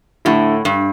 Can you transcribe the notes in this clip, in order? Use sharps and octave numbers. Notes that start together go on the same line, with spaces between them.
A2 D3 A3 E4
G2